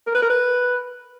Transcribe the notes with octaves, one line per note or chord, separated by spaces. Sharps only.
A#4
B4
A#4
B4